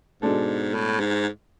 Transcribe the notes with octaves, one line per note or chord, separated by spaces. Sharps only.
G#2 B2 G#3 D4 A4
A2
G#2